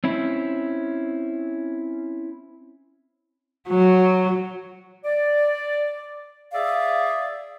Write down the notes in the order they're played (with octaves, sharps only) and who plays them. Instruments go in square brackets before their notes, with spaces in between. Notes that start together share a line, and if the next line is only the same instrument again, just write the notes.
[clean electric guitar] C4 C#4 E4
[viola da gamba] F#3
[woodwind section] D5
G#4 D5 E5 F5